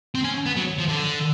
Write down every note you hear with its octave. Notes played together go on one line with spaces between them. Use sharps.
C4
C#4
B3
F#3
F3
D3